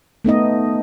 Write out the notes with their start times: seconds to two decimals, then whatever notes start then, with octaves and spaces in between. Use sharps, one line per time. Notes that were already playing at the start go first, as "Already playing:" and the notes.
0.25 A3 B3 D#4 D#5